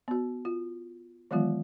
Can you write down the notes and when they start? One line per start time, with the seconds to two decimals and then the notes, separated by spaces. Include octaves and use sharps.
0.08 B3 F#4
0.45 F4
1.31 D#3 E3 F#3 G#3 B3 F4